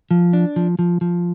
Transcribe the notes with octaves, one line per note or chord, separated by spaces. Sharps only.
F3
D4
F3
F3
F3